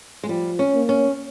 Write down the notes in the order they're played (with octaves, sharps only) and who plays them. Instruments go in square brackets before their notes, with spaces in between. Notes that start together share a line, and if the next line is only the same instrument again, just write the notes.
[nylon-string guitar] G#3
[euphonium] F3 [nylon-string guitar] G3
[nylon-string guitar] C#4
[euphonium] A#3
[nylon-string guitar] C#4